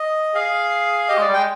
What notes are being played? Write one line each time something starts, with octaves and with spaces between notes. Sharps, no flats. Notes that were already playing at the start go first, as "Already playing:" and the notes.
Already playing: D#5
G#4 F5
G4 D#5
G#3 D5
G3
G#3 G5